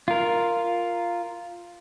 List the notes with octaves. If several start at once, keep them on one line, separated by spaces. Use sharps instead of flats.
F4 A#4